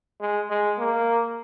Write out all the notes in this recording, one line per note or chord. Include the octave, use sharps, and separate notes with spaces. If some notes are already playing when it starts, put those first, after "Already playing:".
G#3
G#3
A#3